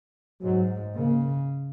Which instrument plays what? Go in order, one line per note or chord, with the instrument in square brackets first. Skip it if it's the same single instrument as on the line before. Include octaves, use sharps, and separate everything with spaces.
[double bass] G#2 [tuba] F#3
[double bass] C#3 [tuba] A#3